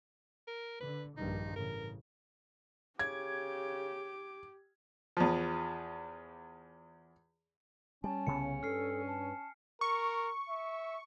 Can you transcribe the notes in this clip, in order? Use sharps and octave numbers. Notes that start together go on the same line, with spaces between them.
A#4
D3 B4
A#1 G2 D#3 D#4
A1 C#3 A#4
C#3 G4 D6 G#6
E2 F3
G3 C#4 G#5 A5
C2 C#3 B3 C#7
G2 A4 F6 C7
A5
A#4 C#6
E5